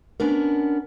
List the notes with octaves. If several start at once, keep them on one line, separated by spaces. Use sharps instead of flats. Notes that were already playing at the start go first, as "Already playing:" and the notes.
B3 C#4 D4 A#4